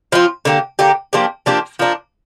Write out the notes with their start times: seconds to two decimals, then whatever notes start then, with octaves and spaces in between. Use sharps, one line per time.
0.12 F3 C4 F4
0.45 D3 A#3 G4
0.79 D3 A#3 G4
1.13 F3 A#3 D4 G4
1.46 F3 A#3 D4 G4
1.79 F3 A#3 D4